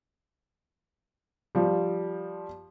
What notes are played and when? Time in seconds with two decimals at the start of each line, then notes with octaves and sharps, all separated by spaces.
1.55 F3 G3